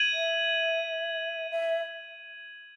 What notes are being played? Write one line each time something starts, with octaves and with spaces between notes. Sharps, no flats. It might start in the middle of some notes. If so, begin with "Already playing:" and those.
Already playing: G#6 D#7 F#7
E5
E5